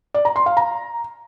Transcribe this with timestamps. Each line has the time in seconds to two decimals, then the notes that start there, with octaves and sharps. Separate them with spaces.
0.14 D5
0.25 A#5
0.36 C6
0.46 F5
0.57 A#5